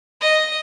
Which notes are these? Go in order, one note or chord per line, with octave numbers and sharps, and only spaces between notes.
D#5